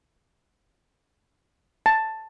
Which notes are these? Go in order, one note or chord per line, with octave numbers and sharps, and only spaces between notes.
A5